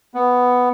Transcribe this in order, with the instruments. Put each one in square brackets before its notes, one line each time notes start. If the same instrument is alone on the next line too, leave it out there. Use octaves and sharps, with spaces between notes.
[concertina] B3